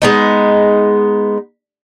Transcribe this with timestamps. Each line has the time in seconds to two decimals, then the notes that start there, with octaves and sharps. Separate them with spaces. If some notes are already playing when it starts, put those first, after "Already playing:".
0.02 G#3 B3 D#4